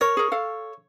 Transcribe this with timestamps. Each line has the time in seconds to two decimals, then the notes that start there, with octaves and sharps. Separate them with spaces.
0.01 A#4 C#5
0.17 G#4 A#4
0.32 A4 F5